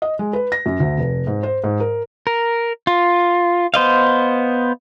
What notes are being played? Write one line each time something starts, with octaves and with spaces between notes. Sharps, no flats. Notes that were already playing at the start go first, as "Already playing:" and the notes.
D#5
G#3
B4
A#6
F#2
D2
F1
G#2
C5
G#2
A#4
A#4
F4
B3 C5 D#5 F5